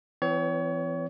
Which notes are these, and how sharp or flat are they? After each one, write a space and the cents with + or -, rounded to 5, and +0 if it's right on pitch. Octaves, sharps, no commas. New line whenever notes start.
E3 +35 C4 -35 C#5 +30